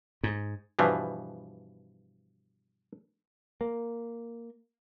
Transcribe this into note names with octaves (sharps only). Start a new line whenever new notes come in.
G#2
G2 B2 E3 F3
A#3